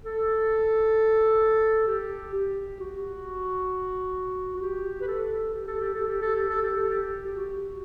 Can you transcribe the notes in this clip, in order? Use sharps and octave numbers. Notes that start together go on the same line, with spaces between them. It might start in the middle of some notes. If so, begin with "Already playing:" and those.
A4
G4
G4
F#4
F#4
G4
B4
A4
G4
A4
G4
A4
G4
A4
G4
A4
G4
A4
G4
G4
F#4